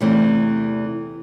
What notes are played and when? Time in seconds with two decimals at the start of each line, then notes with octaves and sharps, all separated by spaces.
0.01 E2 C3 E3 A3 C4